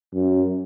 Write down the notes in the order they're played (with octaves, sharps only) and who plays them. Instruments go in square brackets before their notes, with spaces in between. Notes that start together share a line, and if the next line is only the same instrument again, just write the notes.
[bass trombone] F#2